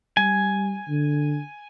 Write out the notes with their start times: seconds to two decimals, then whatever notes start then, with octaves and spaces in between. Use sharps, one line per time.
0.17 G3 G#5
0.88 D3